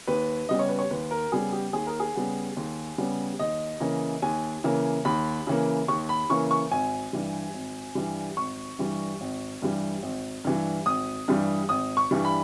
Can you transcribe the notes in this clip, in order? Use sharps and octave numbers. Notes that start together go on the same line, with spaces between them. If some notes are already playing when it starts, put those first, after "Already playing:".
D#2 B4
C#3 G3 B3 D#5
C#5
B4
C#5
D#2 B4
A#4
C#3 G3 B3 G#4
G4
D#2 G#4
A#4
G#4
C#3 G3 B3
D#2
C#3 G3 B3
D#2 D#5
C#3 E3 A#3
D#2 G#5
C#3 E3 A#3
D#2 B5
C#3 E3 A#3
D#2 C#6
B5
C#3 E3 A#3 C#6
C#6
G#1 G#5
G2 E3 G3
G#1
G2 E3 G3
G#1 C#6
G2 E3 G3
G#1
G2 E3 G3
G#1
G2 E3 G3
G#1 D#6
G2 E3 G3
G#1 D#6
C#6
G2 E3 G3
B5